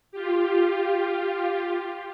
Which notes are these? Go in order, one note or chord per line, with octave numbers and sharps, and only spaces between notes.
F4 G4